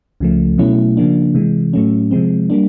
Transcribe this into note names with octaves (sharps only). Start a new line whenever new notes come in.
C#2 C#3 F3 A3
B2 F#3 A3 C#4 E4
C#3 F3 A#3 D4
C3 E3 G#3
A2 F#3 A3 C#4
C3 F3 G#3 C4
G3 A#3 D4